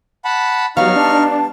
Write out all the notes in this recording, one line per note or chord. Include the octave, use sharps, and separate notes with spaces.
F#5 A5 B5
F#3 G3 B3 D#4 F5 C#6 F6
D4 A5